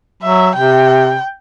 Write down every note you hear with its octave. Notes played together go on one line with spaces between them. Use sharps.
F#3 E5
C3 G5